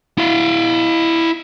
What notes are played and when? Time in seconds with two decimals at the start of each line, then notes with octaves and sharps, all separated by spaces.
0.18 E4 F5